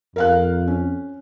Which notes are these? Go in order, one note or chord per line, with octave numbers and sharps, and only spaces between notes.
F2 A#4 F5 F#6
C#4